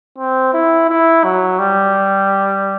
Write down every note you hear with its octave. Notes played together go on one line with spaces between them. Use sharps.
C4
E4
E4
F#3
G3